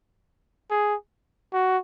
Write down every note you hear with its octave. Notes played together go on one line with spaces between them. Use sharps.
G#4
F#4